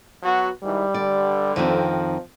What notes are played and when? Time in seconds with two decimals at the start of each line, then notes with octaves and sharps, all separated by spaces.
0.23 F#3 B3 F#4
0.64 G#2 D#3 E3 G3
0.94 G2 D3 D5
1.56 F2 D#3 F3 C4